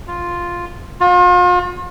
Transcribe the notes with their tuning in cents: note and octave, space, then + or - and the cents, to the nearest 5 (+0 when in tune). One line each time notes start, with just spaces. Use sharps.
F4 +0
F4 +40